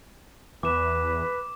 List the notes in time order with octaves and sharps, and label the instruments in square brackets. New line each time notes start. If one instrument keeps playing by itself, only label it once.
[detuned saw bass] E2 [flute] B4 [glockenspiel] D6 E7